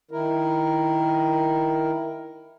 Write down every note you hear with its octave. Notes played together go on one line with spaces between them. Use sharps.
D#3 E4 A#4